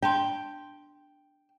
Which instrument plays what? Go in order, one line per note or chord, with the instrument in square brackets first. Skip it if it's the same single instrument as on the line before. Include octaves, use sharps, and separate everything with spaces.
[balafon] D4 A5 C6 [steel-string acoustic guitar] G5